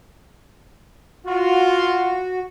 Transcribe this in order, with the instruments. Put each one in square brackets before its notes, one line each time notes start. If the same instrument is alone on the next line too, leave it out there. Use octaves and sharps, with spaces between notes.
[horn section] F4 [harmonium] F#4